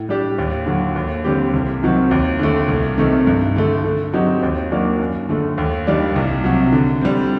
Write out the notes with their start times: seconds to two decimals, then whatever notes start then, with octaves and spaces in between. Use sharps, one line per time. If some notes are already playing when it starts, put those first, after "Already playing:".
Already playing: A2
0.09 G3 D4 G4
0.38 D#2
0.66 D3 F#3
0.96 D#2
1.25 D3 G3 C4 G4
1.54 C2
1.83 C3 D#3 F#3 C4
2.11 D#2
2.39 D3 A3
2.68 C2
2.98 C3 D#3 A3
3.27 G2
3.56 D3 A3
3.84 D3
4.14 F#3 C4 D#4 G4
4.43 D#2
4.71 D#3 F#3 A#3 D4
4.99 F#2
5.29 D3 A3
5.58 D#2
5.87 D#3 G3 D4
6.16 C2
6.44 C3 F#3
6.72 D3
7.01 G3 C4